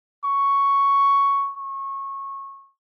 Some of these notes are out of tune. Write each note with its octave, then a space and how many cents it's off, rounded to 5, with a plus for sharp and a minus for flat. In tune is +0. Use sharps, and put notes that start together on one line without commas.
C#6 +5
C#6 -20